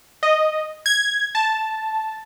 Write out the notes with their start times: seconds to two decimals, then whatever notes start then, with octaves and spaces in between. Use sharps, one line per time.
0.23 D#5
0.86 G#6
1.35 A5